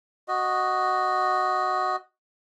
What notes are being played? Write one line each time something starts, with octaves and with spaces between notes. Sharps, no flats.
F#4 D#5